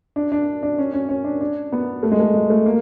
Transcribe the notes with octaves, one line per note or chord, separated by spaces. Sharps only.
D4
D4
D4
C#4
C#4
C#4
D4
D4
B3
A3
G#3
A3
G#3
A3
A#3